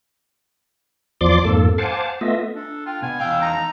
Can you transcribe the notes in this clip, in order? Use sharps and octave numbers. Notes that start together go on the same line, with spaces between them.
E2 F3 D5 C6 D6
F2 G#2 A#3 A4
C5 F5 F#5 G#5 A5 D6
A3 B3 F4 D#5 E5
D4 A4
F4 G5
B2 F#5 G#5
E2 F5 G5 E6
D#4 A#5